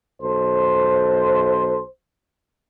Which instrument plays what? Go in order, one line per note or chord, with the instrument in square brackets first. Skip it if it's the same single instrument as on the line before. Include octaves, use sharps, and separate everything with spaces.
[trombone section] B1 A4 C5